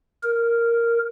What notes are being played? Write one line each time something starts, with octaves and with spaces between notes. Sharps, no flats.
A#4